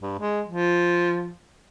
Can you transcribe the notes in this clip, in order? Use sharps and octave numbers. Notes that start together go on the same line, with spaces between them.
G2
G#3
F3